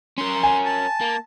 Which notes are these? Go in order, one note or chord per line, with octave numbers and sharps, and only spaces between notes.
C#4 A#4 C6
G#5
A5
A#3